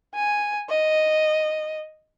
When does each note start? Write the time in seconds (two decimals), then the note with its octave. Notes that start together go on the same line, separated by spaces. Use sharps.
0.15 G#5
0.70 D#5